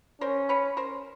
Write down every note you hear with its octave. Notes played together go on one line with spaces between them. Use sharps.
C#4 A#4 C5
B4 C#5
A#4 C5